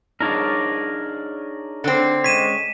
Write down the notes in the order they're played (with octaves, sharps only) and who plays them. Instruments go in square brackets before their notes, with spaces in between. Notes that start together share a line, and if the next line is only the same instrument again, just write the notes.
[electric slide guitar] D4 D#4 G#4 [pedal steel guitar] A#4 C#5 D5
[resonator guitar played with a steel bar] D3 C4
[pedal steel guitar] G#3 C#4 C#5 [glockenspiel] B6 D#7 E7